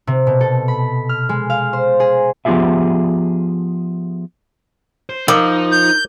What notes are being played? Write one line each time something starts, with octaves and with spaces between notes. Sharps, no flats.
C3
B2
A4
B5
F6
G#3
F5
C5
G#4
F3 B3 F4 G4 G#4 E5
C5
F3 D#4 A#4 D6
G6